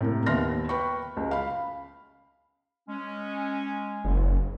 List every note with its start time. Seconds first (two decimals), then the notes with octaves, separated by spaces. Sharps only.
0.01 A2 C3 A#3
0.26 D#2 B3 E5 C6 F6 A#6
0.69 B4 G5 B5 C#6
1.17 C#2
1.31 F5 B5
2.89 G#3 C#4
4.04 F#1